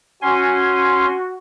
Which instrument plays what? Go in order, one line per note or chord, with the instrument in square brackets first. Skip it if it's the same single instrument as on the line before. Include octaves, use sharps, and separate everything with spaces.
[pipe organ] C#4 G#5 C6 [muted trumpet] F#4